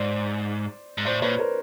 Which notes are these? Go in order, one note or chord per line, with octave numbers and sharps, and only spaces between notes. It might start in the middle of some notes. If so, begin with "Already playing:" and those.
Already playing: G#2 C5 D5
G#2
A2 C5 D5
A#2 B4 C#5
A#4 C5